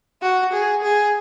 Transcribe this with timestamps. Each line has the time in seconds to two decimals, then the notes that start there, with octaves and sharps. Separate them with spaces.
0.22 F#4
0.53 G#4
0.83 G#4